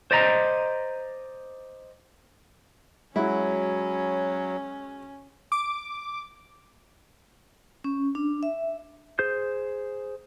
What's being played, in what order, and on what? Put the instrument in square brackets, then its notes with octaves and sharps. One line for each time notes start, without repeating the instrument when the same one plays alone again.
[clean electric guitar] C5 D5 D#5 A#5
[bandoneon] F#3 [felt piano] G#3 F#4 [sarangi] C#4 [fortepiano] E4
[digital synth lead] D6
[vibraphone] C#4
D4
E5
[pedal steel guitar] G#4 C5 G6